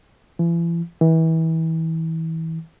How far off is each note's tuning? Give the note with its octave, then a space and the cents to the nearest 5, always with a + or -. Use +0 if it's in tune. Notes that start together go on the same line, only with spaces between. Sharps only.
E3 +40
E3 -30